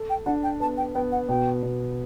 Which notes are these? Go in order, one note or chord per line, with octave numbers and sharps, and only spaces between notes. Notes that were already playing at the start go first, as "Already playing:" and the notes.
Already playing: A4
G5
D4 F#5
G5
B3 A5
G5
B3 G5
F#5
B2 G5
B2